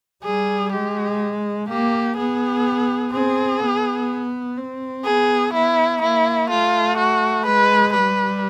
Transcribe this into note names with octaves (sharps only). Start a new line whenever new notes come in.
G3 G#4
G#3 G4
A#3 G4
B3 G#4
C4 G#4
B3
C4
B3 G#4
B3 E4
A#3 E4
A3 F4
F#4
G#3 B4
G3 B4